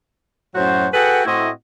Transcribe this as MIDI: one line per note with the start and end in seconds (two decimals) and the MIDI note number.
0.55 0.87 42
0.55 0.87 45
0.55 0.87 54
0.55 0.87 66
0.55 0.87 72
0.93 1.24 66
0.93 1.24 68
0.93 1.24 69
0.93 1.24 71
0.93 1.24 78
0.93 1.24 79
1.26 1.50 45
1.26 1.50 57
1.26 1.50 60
1.26 1.50 64
1.26 1.50 66
1.26 1.50 75